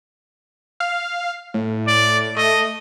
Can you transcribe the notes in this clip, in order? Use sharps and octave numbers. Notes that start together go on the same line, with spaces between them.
F5
A2
D5
A3 D#5